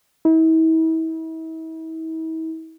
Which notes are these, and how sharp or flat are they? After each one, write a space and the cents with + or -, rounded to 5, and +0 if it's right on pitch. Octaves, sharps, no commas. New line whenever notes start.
E4 -40